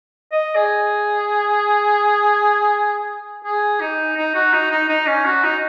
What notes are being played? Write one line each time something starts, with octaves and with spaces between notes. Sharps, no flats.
D#5
G#4
G#4
D#4
D#4
F#4
D#4
D#4
D#4
C#4
F#4
D#4